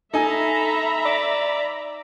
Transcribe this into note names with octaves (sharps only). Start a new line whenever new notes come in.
D#4 A4 E5 G#5 A#5 B5
D5